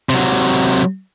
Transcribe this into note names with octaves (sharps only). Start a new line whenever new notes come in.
C3 F#3